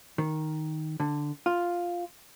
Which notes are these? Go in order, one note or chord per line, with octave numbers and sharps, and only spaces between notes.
D#3
D3
F4